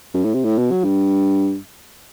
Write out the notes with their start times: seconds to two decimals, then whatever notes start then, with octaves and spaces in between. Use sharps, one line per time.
0.14 F#2
0.25 A2
0.34 C3
0.44 A2
0.58 B2
0.71 F#3
0.84 G2